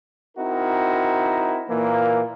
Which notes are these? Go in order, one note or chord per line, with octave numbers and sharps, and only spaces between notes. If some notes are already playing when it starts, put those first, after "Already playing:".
C4 D#4 E4 F#4 A#4
A#2 E3 A#3